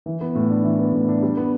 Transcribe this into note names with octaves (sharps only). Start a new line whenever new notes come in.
E3
B3
A2
D4
E3
B3
A2
D4
G3
B3